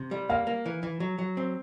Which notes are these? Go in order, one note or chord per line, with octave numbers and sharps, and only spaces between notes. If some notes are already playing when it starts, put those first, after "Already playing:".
Already playing: C3
G3
A#3 F5
A#3
E3
E3
F#3
F#3
C4